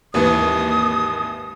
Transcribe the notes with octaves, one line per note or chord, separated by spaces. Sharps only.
G#1 D#2 E3 D#6